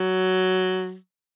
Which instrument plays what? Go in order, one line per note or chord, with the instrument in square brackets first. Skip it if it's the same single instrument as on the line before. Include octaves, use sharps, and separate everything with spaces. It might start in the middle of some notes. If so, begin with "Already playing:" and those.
Already playing: [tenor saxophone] F#3